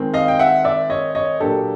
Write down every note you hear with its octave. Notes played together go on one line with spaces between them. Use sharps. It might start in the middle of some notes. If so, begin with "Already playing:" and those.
Already playing: D#3 G#3 C4
D#5 F5
G5
E5 F#5
D5 E5
C#5 D#5
C#5 D#5
A#2 F#3 A#3 D4 G4 A4